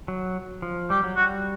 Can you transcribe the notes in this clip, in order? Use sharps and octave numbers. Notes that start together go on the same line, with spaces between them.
F#3
F3
G3 G4
F#3
G3 F#4